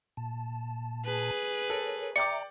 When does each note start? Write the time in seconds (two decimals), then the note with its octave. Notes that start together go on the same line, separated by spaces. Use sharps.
0.17 A#2 A5
1.05 G#4 B4
1.70 A4 A#4 C#5
2.16 D5 E5 G5 A#5 D6 C#7